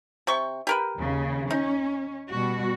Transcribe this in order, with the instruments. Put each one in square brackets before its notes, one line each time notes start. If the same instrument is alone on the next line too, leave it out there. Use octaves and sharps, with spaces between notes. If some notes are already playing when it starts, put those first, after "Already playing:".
[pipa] C3 G5 C#6
G4 A#4 B4
[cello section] D#2 C#3
[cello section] C#4 [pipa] D#4
[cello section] B2 G3 F#4